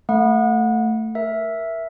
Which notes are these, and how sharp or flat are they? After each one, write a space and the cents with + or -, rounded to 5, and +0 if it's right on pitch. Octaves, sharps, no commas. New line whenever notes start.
A3 +10 F#5 -30
A#4 +10 E5 +0